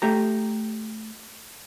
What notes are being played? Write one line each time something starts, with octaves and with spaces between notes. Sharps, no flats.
A3 G4 A#5